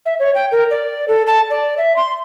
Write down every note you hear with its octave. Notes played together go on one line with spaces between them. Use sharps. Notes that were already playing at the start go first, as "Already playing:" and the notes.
E5
C#5
G5
A#4
D5
A4
A5
D5
E5
C6